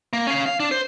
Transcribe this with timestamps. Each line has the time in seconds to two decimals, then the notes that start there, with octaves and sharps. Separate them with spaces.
0.13 A#3
0.27 C#4 F5
0.46 F5
0.60 D4
0.71 C5